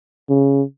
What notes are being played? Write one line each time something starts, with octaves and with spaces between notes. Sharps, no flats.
C#3